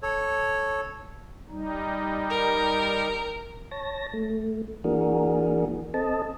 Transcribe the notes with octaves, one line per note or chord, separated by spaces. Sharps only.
A4 C#5
G3 D#4
A#4
C#5 A5 A#6
A3
E3 A#3 D4 F#4 G#4 A#4
C4 A4 D#5 A5